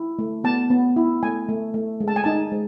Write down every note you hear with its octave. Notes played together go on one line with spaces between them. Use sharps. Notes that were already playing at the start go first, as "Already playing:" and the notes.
Already playing: E4
A3
B3 A5
B3
E4
A3 G#5
A3
A3
G#3
A5
G#5
D#4 A5
G#3